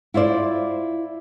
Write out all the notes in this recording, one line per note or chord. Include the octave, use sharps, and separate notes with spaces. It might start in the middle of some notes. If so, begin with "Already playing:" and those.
E4 F4 C5 D5